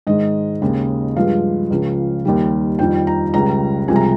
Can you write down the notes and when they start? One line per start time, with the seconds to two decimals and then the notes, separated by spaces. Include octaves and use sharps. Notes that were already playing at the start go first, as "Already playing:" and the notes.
0.07 G#2 D#3 G#3 D#5
0.62 D#2 C#3 G#3
1.16 G2 F3 G#3 F5
1.71 C#2 C#3 F3
2.25 D#2 D#3 G3
2.79 F2 D#3 G3 G5
3.07 A#5
3.34 C#2 C#3 G3 A#5
3.88 C2 C3 F3 G#3 G#5
3.96 A#5